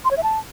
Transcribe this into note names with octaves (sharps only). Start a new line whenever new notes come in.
C6
C#5
E5
A5